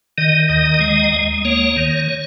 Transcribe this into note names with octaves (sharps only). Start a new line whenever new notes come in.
D#3 D#5
D#2 D#5
G#3
D#2
A#3 C#5
D#3